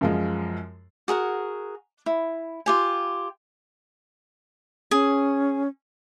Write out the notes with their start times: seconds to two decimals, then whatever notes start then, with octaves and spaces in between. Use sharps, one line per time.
0.01 F#2 F3 G#3
1.08 F#4 G#4 A#4 F#5
2.06 E4
2.66 F4 G4 G#5
4.91 C#4 G#4